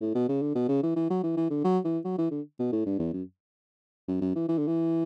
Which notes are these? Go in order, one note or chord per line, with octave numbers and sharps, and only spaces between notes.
A2
B2
C#3
D3
B2
C#3
E3
E3
F#3
E3
E3
D3
F#3
E3
F#3
E3
D3
B2
A2
G2
E2
F#2
F#2
F#2
E3
E3
D3
E3